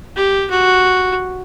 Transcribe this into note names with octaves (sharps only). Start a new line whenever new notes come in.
G4
F#4